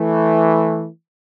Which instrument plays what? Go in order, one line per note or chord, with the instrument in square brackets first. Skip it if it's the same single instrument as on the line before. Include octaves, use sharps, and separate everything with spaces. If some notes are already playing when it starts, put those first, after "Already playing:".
Already playing: [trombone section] E3 A3